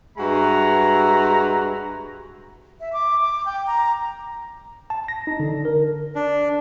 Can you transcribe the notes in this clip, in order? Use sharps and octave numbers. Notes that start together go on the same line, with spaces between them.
G2 G#3 F#4 B4 E5 A#5
E5
D6
D6
G5
A#5
A5
A#6
D#4
D3
A#4
D4